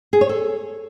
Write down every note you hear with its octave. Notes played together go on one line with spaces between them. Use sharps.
G#4
C#5
A4